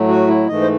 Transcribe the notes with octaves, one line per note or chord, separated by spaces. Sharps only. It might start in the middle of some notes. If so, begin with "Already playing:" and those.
Already playing: A2 F#3 A3
F#4
E4
G#2 E3 A3 D#5
C5